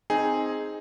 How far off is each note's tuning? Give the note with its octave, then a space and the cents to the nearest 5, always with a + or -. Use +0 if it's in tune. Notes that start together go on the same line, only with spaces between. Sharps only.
C4 +0 D#4 +0 G#4 +0